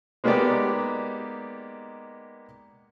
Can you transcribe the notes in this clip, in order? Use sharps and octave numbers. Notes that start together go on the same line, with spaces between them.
G#3 A#3 B3 D#4 G4 D5